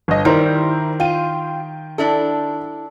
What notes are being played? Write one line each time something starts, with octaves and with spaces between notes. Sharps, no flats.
G1 D#5
D#3 G3 E4 A#4 C5
F4 G5 D#7
D4 E4 A4